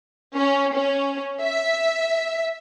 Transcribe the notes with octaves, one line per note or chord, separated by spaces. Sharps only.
C#4
C#4
E5